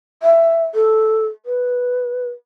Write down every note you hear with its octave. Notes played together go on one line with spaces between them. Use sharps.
E5
A4
B4